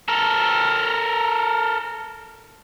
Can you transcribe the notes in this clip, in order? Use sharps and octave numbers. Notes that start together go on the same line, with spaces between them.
A4 A#4